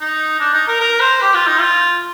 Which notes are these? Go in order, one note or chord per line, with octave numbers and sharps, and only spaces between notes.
D#4
D4
D#4
A#4
A#4
C5
G4
F4
D#4
F4